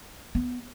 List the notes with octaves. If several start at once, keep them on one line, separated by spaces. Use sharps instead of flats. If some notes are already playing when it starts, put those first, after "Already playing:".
B3